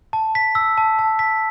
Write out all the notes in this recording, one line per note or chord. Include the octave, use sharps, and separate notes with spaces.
A5
B6
E6
A5
A5
B6